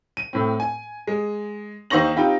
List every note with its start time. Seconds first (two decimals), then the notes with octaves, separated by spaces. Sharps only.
0.17 D#7
0.33 A2 C4
0.60 G#5
1.07 G#3
1.90 D#2 D#4 C5 C#6 A#6 F#7
2.16 C4 D#4 F4 G4 G5 B5